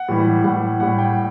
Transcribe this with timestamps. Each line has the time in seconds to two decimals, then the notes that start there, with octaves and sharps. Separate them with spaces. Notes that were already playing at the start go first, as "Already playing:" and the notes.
Already playing: F#5
0.09 A2 E3 G3
0.44 A2 G3 F#5
0.80 A2 G3 F#5
0.98 G5